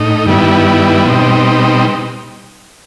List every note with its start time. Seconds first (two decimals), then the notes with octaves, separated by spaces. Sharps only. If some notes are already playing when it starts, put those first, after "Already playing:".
Already playing: A2 D#4
0.26 G2 D#3 G3 B3 E4
1.06 B2 G3 C4 D#4